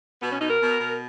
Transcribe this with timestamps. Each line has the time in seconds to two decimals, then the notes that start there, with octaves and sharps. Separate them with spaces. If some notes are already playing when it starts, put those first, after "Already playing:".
0.22 B2 B3
0.31 C#4
0.40 B2 D#4
0.50 A#4
0.61 B2
0.80 B2